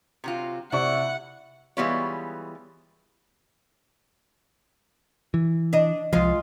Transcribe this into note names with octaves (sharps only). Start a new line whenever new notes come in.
C3 F#3 F4
C3 E4 D5 F#5 C#6
E3 G3 G#3 B3 F4 C#5
E3
D4 D#5
C2 F3 G#3 F4